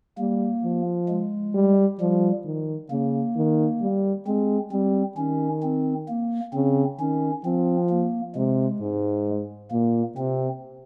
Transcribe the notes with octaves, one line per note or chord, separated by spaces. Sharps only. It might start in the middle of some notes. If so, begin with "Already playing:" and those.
G3 A#3
F3
G#3
G3
F3 G3
D#3
C#3 A#3
D#3
G3
G#3 C4
G3 C4
D#3 C#4
C4
A#3
C#3 C4
D#3 C#4
F3 C4
A#3
C3 G#3
G#2
A#2 A#3
C3 C4